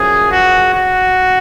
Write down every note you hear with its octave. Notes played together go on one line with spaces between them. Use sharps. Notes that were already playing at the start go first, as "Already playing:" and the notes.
Already playing: F#2 C#3 F3 G#4
F#4
F#4